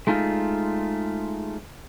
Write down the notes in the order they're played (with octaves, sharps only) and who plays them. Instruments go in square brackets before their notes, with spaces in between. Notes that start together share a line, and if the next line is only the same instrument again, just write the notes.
[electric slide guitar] G#3 A3 D#4 F4